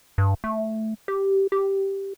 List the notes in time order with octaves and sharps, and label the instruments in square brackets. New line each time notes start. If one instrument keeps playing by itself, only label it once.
[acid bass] G2
A3
G4
G4